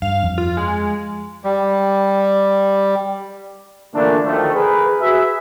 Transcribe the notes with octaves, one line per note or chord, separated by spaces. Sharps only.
G2 F5
F2
F4
G#3
G3
A#2 D3 E3 A3 A#3 D4
D2 D#3 F3 A3
G#4 A#4 B4
F#4 G#4 B4 E5